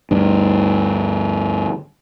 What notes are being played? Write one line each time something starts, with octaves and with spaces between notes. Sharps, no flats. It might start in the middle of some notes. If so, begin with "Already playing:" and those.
D2 G2